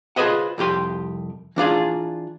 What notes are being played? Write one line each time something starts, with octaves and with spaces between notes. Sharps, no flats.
F4 G#4 B4 C5 D#5 F#5
C2 F2 G4 C6
E3 D4 F4 G#4